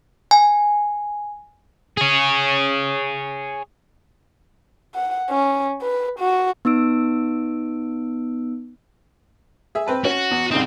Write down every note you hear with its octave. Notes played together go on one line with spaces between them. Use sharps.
G#5
G#4 C#5
F#5
C#4
B4
F#4
B3 D#4 E6 D7
G#4 E5
C4 B4 A5
C#4 F#4
E2
C2 C#3 C4 D#4